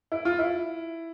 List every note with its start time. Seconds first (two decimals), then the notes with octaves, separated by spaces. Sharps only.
0.12 E4
0.25 F4
0.39 E4